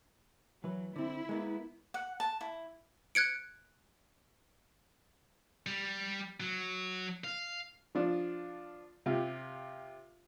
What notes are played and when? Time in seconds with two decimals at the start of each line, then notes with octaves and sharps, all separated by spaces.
0.64 E3 F#3 B4
0.96 D3 C4 E4
1.29 G#3 A#3 B3
1.94 F#5
2.20 A5
2.41 E4
3.15 F#6 G#6 C#7 D7
5.66 G3
6.40 F#3
7.24 F5
7.95 F3 D4 F4
9.06 C3 F4 G4